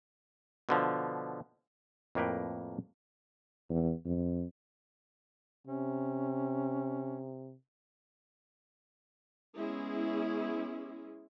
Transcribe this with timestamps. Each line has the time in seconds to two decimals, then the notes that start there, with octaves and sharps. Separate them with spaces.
0.69 B2 D3 F3
2.15 F2 A2 A#3 A#4 B4 G5
3.70 E2
4.05 F2
5.67 C3 C#4
9.56 G#3 B3 C#4 E4 G#4